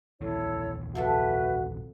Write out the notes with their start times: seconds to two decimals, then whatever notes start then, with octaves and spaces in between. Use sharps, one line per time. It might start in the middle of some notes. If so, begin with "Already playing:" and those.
0.21 A#1 D#2 E3 E4 A4 C#5
0.95 C3 F3 A3 F#4 B4 E5